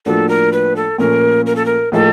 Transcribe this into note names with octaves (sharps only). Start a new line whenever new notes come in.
A2 F3 A#3 D4 F#4 A4
A#4
B4
A4
A#2 F3 A3 C#4 A#4
A#4
A4
A#4
A2 F3 A#3 D#4 G#4 A4